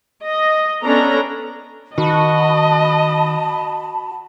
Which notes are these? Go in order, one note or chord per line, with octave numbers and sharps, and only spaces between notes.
D#5
B3 C#4 D4 A4 A#5
D#3 F#4 D#5 A5 B5